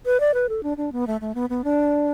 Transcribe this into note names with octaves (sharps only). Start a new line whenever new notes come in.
B4
D5
B4
A4
D4
D4
B3
A3
A3
B3
B3
D4